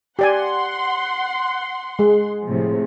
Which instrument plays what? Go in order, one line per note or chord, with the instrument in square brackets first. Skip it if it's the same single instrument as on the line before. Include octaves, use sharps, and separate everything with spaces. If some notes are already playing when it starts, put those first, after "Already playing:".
[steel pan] G4 D5 G#5 [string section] F#5 C6
[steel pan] G#3 [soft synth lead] G#4
[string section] A2 C3 F3